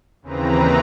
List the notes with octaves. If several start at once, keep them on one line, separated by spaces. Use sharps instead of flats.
D#2 C#3 E3 C4 B4 A#5